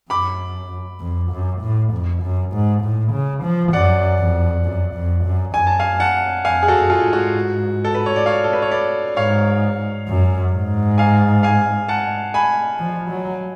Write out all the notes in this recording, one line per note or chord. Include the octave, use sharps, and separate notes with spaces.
F#2 B5 D6
F2
F#2
A2
F2
F#2
G#2
A2
C#3
F3
F#2 D5 F#5
F2
F#2
F2
F#2
F#2 G#5
A5
F5 G#5
F#5 A5
F2 F5 G#5
G#4
F#4 A4
F#2
F4 G#4
G#2
F#4
A4
B4
C#5
D5
C#5 F5
A4
B4
C#5
B4 D5
G#2 C#5 F5
F#2
G#2
F5 G#5
F5 G#5
F#5 A5
G#5 B5
F3
F#3